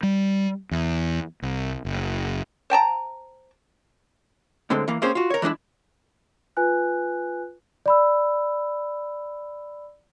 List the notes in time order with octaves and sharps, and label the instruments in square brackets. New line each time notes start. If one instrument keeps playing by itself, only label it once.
[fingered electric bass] G3
E2
C2
F#1
[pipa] C5 G5 A5 A#5
[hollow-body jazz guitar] A2 D3 G#3 C4
E3 A#3
A#3 C4 C#4 G#4 C5
F4 F#4
A#4 C#5
E3 G3 G#3 D4 E4
[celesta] F4 B4 G#5 F#6
D5 B5 E6